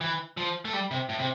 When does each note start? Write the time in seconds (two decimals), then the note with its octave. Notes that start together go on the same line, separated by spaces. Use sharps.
0.01 E3
0.37 F3
0.65 A3
0.73 G3
0.91 C3
1.09 A2
1.19 C3